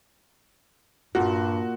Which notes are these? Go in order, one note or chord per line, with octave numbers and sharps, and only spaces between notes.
G2 A#2 F#4